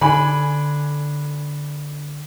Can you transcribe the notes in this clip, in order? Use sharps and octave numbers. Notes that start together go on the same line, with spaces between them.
D3 G#5 B5